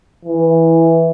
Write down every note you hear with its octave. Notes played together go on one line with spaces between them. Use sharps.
E3